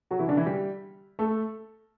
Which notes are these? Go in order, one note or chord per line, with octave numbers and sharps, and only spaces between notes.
F#3 F#4
E3 E4
D3 D4
E3 E4
G3 G4
A3 A4